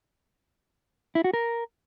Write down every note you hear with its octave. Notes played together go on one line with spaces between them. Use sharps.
E4
F#4
A#4